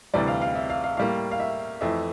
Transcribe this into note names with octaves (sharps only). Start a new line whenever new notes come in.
D2 C3 E3 G3 D5
F5
F5
E5
F5
F5
A2 G3 A#3 F5
F5
E5
F2 E3 A3 E5